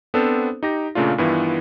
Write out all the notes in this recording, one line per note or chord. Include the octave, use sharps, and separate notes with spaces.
B3 C4 D4 A4 C5
D#4 G4 A#6
A#2 C#3 A3 D4 F4
G2 D#3 E3 B3 E4 F4